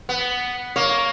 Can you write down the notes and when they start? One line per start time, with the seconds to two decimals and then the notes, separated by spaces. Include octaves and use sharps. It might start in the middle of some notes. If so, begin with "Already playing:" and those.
0.09 B3
0.76 A#3 C#5